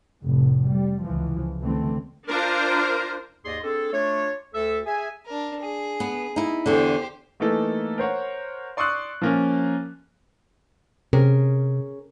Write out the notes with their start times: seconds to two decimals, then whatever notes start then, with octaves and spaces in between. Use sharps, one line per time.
0.23 F1 A2
0.69 G3
1.04 C#2 E3 F3
1.61 C#2 D3 E3 A3 C4
2.29 D4 F4 A#4 C5
3.45 D#2 G#2 G#4 D5 D#5 C6
3.64 C4 D4 G#4 A4
3.93 A3 D4 F4 C#5
4.54 D2 A4 E5
4.86 G#4 E5 G#5
5.26 D4 A#4
5.60 G#4
6.00 B3
6.36 D#4 E4
6.66 E2 D3 G4 C5
7.40 E3 A3 A#3 D#4 A4
7.98 A#4 C5 C#5 F#5
8.77 D5 C6 C#6 D#6 E6 F#6
9.22 F3 A#3 C#4
11.13 C3 C#4 G#4 A#4